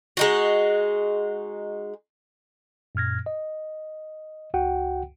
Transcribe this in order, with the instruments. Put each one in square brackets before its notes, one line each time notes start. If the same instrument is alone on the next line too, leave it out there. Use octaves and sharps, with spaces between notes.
[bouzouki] G#3 D#4 F#4
[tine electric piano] F#2 A#2 F6 G#6 A#6
D#5
C#2 F#4 F#5 G5